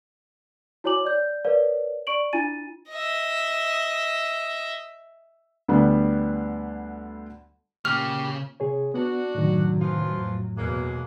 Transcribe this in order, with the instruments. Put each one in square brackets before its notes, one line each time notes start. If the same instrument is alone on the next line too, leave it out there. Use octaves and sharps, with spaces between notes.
[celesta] E4 F#4 C#5 G#5 D6 F#7
D5 G6
A#4 B4 C#5 D5 F5
D5 C#6 D7 F#7
D4 E4 F4 G#5 A6 D#7
[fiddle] D#5 E5
[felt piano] D2 D3 G3 B3
[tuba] A#2 [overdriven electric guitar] C#3 [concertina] G4 [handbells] F6
[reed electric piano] C3 G#4 C#5
[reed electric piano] B3 [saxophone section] D4 F#4
[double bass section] F#2 F#3 [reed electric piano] A2 C3 D#3
[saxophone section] E3 F3 F4
[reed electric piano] F2 A2
[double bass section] E2 B2 [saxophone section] F#3 G#3 A#3